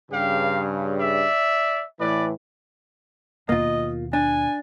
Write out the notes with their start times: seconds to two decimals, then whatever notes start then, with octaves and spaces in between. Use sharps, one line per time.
0.11 G2 C#3 G4 F5
0.99 D5 E5
1.99 A2 E3 B4 D5
3.49 D#2 B2 A#3 F4 D#5
4.13 D4 G#5